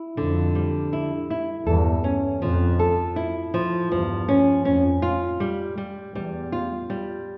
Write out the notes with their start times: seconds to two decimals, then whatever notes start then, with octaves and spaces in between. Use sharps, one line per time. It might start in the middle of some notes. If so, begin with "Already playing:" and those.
Already playing: E4
0.17 F2 D3
0.55 G3
0.93 E4
1.30 E4
1.66 E2 G2 A4
2.04 C#4
2.42 F2 F3
2.79 A4
3.16 E4
3.54 F3
3.91 E2 G2 F3
4.28 C#4
4.65 F2 C#4
5.02 F4
5.40 G3
5.78 G3
6.14 E2 G3
6.52 F4
6.90 G3